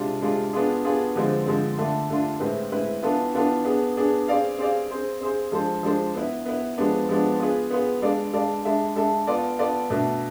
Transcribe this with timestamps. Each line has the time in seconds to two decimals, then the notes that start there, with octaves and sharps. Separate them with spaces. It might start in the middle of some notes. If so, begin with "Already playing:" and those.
Already playing: C3 G#3 D4 F4
0.22 C3 G#3 D4 F4
0.53 B3 D4 F4 G#4
0.85 B3 D4 F4 G#4
1.16 D3 F3 G#3 C4
1.46 D3 F3 G#3 C4
1.77 D3 A3 D4 F4
2.09 D3 A3 D4 F4
2.40 A2 G#3 C4 E4 B4
2.72 A2 G#3 C4 E4 B4
3.03 E3 B3 D4 F4 A4
3.34 E3 B3 D4 F4 A4
3.65 B3 D4 G#4
3.97 B3 D4 G#4
4.28 C4 G#4 D5 F5
4.58 C4 G#4 D5 F5
4.91 C4 G#4 C5
5.21 C4 G#4 C5
5.52 F3 G#3 D4 A4 C5
5.83 F3 G#3 D4 A4 C5
6.15 B3 E4 B4
6.46 B3 E4 B4
6.78 F3 G#3 B3 D4
7.09 F3 G#3 B3 D4
7.40 B3 F4 G#4 B4
7.70 B3 F4 G#4 B4
8.02 G#3 D4 A4 D5 F5
8.33 G#3 D4 A4 D5 F5
8.65 G#3 D4 A4 E5
8.96 G#3 D4 A4 E5
9.27 B3 F4 A4 D5
9.59 B3 F4 A4 D5
9.90 B2 A3 D4